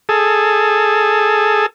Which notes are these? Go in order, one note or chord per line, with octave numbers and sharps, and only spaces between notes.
G#4 A4